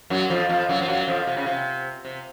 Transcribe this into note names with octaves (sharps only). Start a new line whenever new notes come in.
F#2 F#3
F2 F3
F2 F3
F#2 F#3
F3
F#2 F#3
F2 F3
C3
C#3
C3
C3